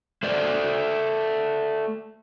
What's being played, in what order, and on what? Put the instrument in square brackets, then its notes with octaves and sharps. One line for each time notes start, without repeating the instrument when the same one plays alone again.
[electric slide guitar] A3 C5 D5